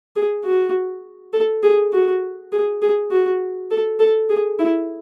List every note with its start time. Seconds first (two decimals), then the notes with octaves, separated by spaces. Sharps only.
0.16 G#4
0.44 F#4
1.33 A4
1.63 G#4
1.92 F#4
2.52 G#4
2.82 G#4
3.11 F#4
3.71 A4
4.00 A4
4.29 G#4
4.59 E4